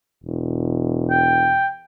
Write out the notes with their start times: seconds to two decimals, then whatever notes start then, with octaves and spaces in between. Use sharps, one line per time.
0.24 E1
1.11 G5